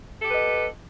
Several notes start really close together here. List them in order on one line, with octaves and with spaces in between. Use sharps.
A4 G4 B4 D#5